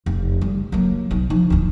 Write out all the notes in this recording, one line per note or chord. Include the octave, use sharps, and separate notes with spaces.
F1
G3
F#3 A#3
B1
F3 D#4
D1 F4